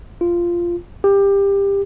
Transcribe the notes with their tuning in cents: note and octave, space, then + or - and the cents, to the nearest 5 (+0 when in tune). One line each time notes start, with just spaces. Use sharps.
F4 -10
G4 +20